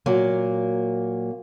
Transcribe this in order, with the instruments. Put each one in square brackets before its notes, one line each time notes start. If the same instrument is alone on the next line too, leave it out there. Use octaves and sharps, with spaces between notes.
[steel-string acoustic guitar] A#2 F#3 A#3